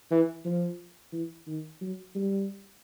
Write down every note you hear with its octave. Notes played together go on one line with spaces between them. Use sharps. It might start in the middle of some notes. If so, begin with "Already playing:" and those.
E3
F3
E3
D#3
F#3
G3